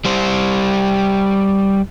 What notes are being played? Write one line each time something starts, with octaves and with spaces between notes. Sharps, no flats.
G3 C5